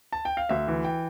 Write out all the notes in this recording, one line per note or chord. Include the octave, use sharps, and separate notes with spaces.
A5
G5
F5
D2 E5
E3
G5